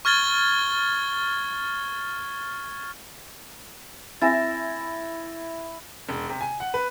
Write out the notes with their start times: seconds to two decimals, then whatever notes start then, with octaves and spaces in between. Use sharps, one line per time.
0.05 C#6 F6 G#6 A6 G7
4.22 C4 E4 E5 G#5 A6 A#6
6.09 E1
6.29 C3
6.41 G#5
6.60 F#5
6.74 B4